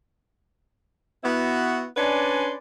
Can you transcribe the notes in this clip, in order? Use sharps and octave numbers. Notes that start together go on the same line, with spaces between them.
B3 E4 F#4
C#4 D4 B4 D5 G#5 C6